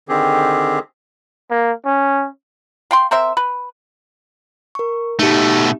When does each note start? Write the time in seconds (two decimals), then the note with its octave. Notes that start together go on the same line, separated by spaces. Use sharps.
0.09 D3 D#3 C4 G4 G#4
1.51 A#3
1.86 C#4
2.91 F5 G5 C6
3.11 C4 A#4 C5 E5
3.37 B4
4.75 A#4 C#6
5.19 B2 A3 D#4 G4